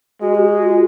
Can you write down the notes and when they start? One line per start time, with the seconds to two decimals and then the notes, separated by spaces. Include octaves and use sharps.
0.21 G#3 F#4
0.35 G4
0.48 F#4
0.62 F4